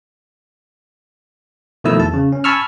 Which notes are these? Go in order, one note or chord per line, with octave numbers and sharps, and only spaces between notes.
B2 D#3 F3 A3 E4 E6
E2 A5
C#3
C#4
G#5 A5 B5 C#6 E6 F6